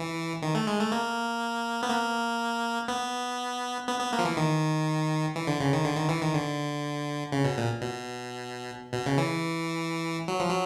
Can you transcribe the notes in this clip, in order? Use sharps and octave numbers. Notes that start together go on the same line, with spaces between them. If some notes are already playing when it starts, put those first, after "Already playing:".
Already playing: E3
D#3
A3
G#3
A3
A#3
B3
A#3
B3
B3
B3
A#3
F3
E3
D#3
E3
D3
C#3
D#3
D3
D#3
E3
D#3
D3
C#3
B2
A#2
B2
B2
C#3
E3
F#3
F3
F#3